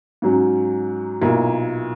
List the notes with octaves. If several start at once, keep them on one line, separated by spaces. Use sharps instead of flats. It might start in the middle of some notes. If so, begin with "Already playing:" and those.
G#2 F#3 C#4
B1 A#2 A#3 E4